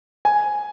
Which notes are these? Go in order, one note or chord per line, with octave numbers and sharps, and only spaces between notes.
G#5